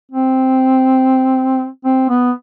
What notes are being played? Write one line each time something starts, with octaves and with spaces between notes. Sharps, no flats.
C4
C4
B3